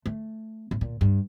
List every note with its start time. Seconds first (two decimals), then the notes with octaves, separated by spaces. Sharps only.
0.06 A3
0.71 A2
0.81 A#2
1.01 G2